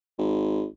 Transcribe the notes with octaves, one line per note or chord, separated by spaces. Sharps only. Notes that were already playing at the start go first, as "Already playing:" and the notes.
G#1